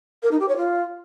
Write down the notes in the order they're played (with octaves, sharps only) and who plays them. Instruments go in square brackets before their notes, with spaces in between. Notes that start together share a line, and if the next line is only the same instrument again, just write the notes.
[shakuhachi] A#4
D#4
G4
C#5
F4